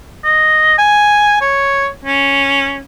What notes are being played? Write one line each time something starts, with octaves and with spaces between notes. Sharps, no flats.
D#5
G#5
C#5
C#4